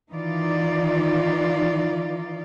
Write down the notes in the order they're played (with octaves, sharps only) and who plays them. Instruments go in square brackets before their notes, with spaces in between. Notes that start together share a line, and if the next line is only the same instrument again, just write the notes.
[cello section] D#3 E3 D#4 F4 D5